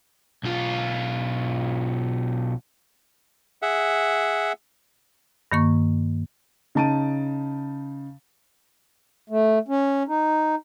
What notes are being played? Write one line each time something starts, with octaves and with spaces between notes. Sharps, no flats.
B1 F4
G#4 E5 F#5
G2 D#3 A#3 C#6
C#3 D#4 A5 D7 D#7
A3
C#4
D#4